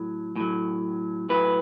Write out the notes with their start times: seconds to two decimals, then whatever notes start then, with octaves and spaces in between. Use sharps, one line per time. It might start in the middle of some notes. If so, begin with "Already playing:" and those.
Already playing: A2 F#3
0.36 A2 F#3
1.29 A2 F#3 B4